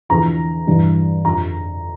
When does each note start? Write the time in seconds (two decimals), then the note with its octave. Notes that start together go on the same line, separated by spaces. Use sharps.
0.09 E2 D3 F3 A#5
0.67 G2 E3 G3
1.25 F2 D3 F3 A#5